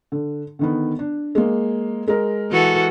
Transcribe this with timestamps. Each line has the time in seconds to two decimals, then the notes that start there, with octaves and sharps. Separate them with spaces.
0.12 D3
0.59 D3 D#3 B3
0.99 D4
1.35 G#3 A#3
2.08 G#3 A#4
2.51 E3 F#4 A4